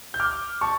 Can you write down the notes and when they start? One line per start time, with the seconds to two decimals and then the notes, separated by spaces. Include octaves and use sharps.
0.14 G6
0.20 D6 F6
0.61 A5 C#6